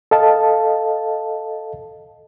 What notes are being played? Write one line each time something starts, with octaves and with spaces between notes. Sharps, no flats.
A4 D#5 F5 A5